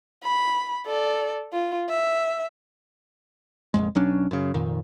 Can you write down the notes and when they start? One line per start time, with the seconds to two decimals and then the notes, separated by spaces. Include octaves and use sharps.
0.24 B5
0.86 A4 D5
1.53 F4
1.89 E5
3.74 F1 A#1 F2 G#3
3.95 B1 F#3 C#4 D4
4.31 F#2 C#3
4.54 F1 F2 A#2 D#3